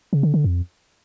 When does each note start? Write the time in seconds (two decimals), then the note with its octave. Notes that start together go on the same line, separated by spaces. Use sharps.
0.13 C#3
0.23 D3
0.34 D3
0.44 F2